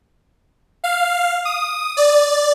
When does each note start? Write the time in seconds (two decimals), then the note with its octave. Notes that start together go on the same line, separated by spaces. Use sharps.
0.84 F5
1.45 D#6
1.97 D5